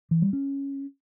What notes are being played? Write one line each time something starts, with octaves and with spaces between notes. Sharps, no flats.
E3
G3
C#4